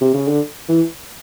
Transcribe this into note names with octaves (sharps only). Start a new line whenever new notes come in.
C3
C#3
D3
E3